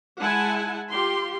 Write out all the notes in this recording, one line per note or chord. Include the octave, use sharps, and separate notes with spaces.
G#3 E4 F#5 G#5 A5
F4 G4 C6